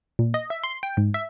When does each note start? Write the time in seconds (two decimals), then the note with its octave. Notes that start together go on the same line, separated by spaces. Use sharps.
0.19 A#2
0.34 D#5
0.50 E5
0.64 C6
0.83 G5
0.97 G#2
1.14 E5